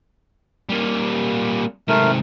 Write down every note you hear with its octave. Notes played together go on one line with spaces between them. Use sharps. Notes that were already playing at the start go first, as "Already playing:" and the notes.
G3 A#3
G#2 C3 A3 A#4